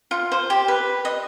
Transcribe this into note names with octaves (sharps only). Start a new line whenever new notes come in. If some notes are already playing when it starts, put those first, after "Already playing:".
F4
C5
G4
B4
D#5